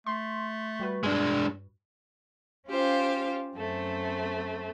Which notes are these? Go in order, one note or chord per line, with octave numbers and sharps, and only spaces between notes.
A3 C6
G3 F#4 B4
G2 G#3 D4
C#4 F4 G4 C5 F5
F#2 A3 C4